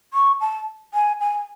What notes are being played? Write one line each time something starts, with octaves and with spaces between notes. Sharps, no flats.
C#6
A5
G#5
G#5